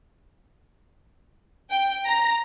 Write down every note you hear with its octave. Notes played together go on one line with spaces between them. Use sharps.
G5
A#5